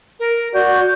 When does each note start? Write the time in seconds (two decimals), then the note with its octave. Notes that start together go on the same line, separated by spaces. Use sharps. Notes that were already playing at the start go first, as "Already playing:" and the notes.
0.20 A#4
0.54 F#4 D5 G6